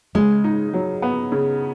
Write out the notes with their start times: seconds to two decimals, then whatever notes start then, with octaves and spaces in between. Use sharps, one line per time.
0.15 C#3 G#3
0.44 D#4
0.73 F#3
1.02 B3
1.32 C#3